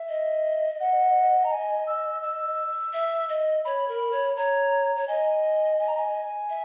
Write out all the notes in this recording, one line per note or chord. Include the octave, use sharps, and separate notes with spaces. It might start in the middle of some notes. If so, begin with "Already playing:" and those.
Already playing: E5
D#5
F#5
A#5
G#5
E6
E6
E5
D#5
C#5 B5
A#4
C#5
C#5 A#5
C#5
D#5 G#5
G#5
A#5
G#5
E5